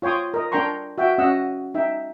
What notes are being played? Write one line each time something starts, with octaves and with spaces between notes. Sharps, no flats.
F4 C#5 G5 C6 D#6
A#4 D#5
D4 A#4 G5 A#5 C6 C#6
F#4 E5 G5
C#4 F#4 D#5 F#5 E6
D#4 E5 G5